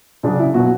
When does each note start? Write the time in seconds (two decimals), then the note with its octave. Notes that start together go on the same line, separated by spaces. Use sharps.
0.23 C#3 F#3 D4
0.39 E4
0.54 B2 F#3 F#4